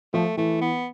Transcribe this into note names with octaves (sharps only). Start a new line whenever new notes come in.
F3 A3
E3 A3
B3